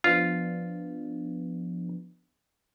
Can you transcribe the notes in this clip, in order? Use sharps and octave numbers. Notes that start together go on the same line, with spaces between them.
F3 B3 D4 F4